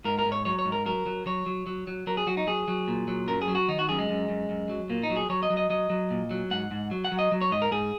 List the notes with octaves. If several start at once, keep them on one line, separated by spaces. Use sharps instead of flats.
G#2 A#4
A#4
G#2
C#5
F#3 C#5
C#5
G#2
A#4
F#3 A#4
F#3
F#3 C#5
F#3
F#3
F#3
F#3 A#4
G#4
F#3 F#4
D#4
F#3 G#4
F#3
A#2
F#3
F#2 A#4
G#4
F#3
F#4
D#3 D#4
F#4
F#2 G#4
G#3
F#2
F#2
F#2
F#3
A#2 A#3
D#4
F#3
G#4
F#3 C#5
D#5
F#3
D#5
F#3 D#5
F#3
A#2
F#3
G#2 F#5
G#2
F#3
F#5
F#3
D#5
F#3
C#5
G#2 D#5
A#4
G#2 G#4